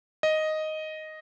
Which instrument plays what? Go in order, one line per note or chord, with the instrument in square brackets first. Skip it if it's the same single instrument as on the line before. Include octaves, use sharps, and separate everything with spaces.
[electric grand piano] D#5